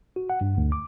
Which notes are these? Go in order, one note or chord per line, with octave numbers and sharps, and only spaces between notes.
F#4
F#5
G2
D2
D6